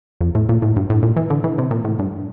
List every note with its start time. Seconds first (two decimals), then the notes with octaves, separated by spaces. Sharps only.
0.21 F2
0.35 A2
0.49 A#2
0.62 A2
0.76 G2
0.90 A2
1.03 A#2
1.16 E3
1.30 D3
1.44 E3
1.58 C3
1.71 A#2
1.85 A2
1.99 G2